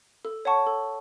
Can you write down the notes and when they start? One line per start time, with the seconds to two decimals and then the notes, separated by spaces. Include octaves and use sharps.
0.25 A4
0.45 C#5 F#5 A5 C#6
0.67 A4